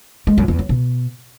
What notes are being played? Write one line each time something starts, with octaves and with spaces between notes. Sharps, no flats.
G#3
F#2
E2
F#3
B2